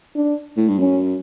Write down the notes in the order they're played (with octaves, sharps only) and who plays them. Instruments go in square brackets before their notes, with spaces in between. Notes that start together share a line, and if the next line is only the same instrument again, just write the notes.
[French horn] D4
[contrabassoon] A2
G2
[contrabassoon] F#2 [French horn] C#4